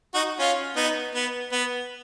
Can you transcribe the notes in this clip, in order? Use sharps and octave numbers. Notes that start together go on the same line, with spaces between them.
D#4 F#4
C#4 F4
B3 D#4
B3
B3